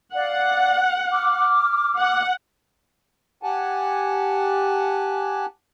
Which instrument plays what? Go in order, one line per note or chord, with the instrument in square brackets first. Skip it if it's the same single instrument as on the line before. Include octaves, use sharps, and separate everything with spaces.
[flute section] D5 F5 [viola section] F#5
[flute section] D6 F6
[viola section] F#5
[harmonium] G4 F#5 G#5 A5